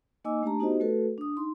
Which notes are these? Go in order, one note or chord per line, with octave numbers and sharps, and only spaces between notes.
A#3 D#4 D#5 G#5 D6 E6
A3 D4 G4 A5 A#5
B3 D#4 F#4 G4 C5 D#5
A3 F#4 A4 B4
D4 D#6
D#4 C6